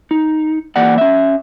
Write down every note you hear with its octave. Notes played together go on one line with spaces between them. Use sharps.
D#4
E3 A#3 D5 F#5
C#4 E5